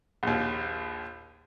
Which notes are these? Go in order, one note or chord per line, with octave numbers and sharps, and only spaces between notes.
A#1 D#2